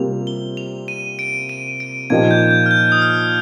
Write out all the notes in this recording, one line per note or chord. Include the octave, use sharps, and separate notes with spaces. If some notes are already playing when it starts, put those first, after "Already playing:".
Already playing: C3 G3 A#3 F4 F7
G7
F7
D#7
D7
D#7
D7
A#2 F3 A#3 D#4 G4 G#6
G6
G6
F6
G6
D#6
F6